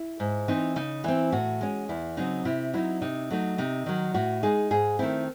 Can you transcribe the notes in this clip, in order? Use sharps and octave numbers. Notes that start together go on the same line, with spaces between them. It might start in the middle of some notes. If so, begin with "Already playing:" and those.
Already playing: E4
G#2
E3 C4 D#4
C#3 D#4
E3 C4 E4
A2 F#4
G#3 C#4
E2 E4
C#3 F#3 C4 D#4
C3 E4
F#3 C4 D#4 E4
C3 D#4
F#3 A3 D#4
C3 D#4
D#3 F#3
A2 F#4
G#3 D#4 G#4
G#2 G#4
D#3 A3 C4 E4